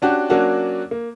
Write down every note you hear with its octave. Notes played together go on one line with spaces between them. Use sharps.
C#4 D4 F#4 G4
F#3 A#3 C#4 D4 F#4
A#3